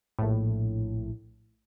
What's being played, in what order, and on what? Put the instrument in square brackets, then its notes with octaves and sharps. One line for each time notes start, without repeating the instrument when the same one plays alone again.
[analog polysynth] A#1 A2